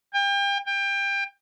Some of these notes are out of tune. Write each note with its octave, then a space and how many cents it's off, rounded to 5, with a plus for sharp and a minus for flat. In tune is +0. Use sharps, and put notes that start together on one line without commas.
G5 +35
G5 +25